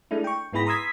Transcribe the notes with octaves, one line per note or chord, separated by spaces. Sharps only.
G#3 A3 D4 E4
G5 C#6
G#2 B3 E4 G#4 B5 A#6
A#5 C6 D#6 E6 G#6 B6